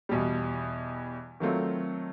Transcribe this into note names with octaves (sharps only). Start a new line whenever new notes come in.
E2 B2 G3
D#3 F#3 A3 C4 F4